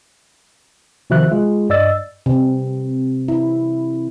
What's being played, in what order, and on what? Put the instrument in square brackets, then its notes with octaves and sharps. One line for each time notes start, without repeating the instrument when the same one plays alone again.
[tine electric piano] C3 D#3 F3 F#4 E5 F#6
G#3 F4 G#4
G2 D5 D#5 E6 A6
[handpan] C3
E4